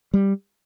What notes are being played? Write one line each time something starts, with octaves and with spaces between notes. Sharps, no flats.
G3